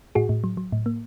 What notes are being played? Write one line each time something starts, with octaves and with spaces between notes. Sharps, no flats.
A2 F#4 G#4
A2
F#3
F#3
A2
A#3